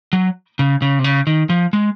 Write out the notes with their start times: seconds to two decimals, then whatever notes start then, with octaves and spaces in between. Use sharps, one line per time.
0.13 F#3
0.59 C#3
0.82 C#3
0.99 C3
1.04 C#3
1.27 D#3
1.50 F3
1.73 G#3